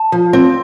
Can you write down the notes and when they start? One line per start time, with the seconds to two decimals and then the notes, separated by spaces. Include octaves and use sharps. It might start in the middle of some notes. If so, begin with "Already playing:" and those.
Already playing: A5
0.12 F3
0.33 C4